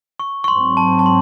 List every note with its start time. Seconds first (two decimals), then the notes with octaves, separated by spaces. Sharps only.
0.20 C#6
0.44 C#6
0.48 G#2 F#3 C4 C6
0.77 A5
0.99 A5
1.06 C6